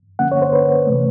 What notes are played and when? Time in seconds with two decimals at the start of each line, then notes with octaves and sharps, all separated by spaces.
0.19 D3 F3 A#3 C#4 F#5
0.32 C#5
0.42 C5
0.53 B4
0.87 C3 E3 A3